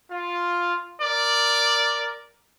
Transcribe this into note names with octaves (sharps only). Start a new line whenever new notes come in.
F4
A#4 D5